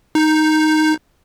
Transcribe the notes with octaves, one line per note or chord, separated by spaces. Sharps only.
D#4 G6